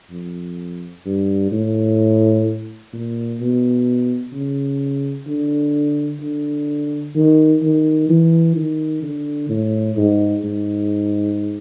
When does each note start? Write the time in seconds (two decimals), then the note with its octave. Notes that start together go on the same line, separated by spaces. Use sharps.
0.11 F2
1.06 G2
1.52 A2
2.93 A#2
3.41 B2
4.33 C#3
5.27 D3
6.21 D3
7.16 D#3
7.63 D#3
8.10 E3
8.56 D#3
9.02 D3
9.49 A2
9.97 G#2
10.44 G#2